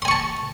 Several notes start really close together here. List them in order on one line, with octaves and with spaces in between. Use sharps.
C6 G#5 C#6 A5